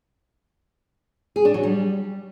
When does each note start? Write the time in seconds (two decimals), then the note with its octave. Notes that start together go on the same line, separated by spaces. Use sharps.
1.36 G#4
1.45 D4
1.54 F#3
1.63 G3